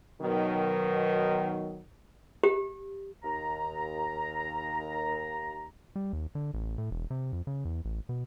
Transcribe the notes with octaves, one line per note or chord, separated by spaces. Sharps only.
B2 D#3 F#3
G4
D#2 A#5
G3
D#2
D3
A1
A2
E1
C3
F2
C#3
E2
A1
B2